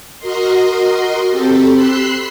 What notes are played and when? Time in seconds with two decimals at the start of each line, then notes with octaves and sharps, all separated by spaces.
0.19 F#4 A#4 D#5 C6
1.29 C4 G4 A4
1.73 B5 C6 E6 F#6 C7